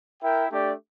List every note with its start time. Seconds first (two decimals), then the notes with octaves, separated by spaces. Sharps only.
0.21 E4 A#4 E5 G5
0.50 A3 D4 G4 D5